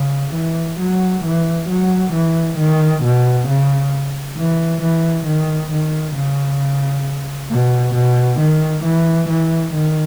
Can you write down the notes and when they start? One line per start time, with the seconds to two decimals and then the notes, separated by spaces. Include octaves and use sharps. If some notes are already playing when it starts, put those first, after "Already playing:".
Already playing: C#3
0.34 E3
0.79 F#3
1.24 E3
1.69 F#3
2.13 E3
2.58 D#3
3.03 B2
3.48 C#3
4.37 E3
4.82 E3
5.26 D#3
5.71 D#3
6.15 C#3
7.50 B2
7.94 B2
8.39 D#3
8.83 E3
9.29 E3
9.73 D#3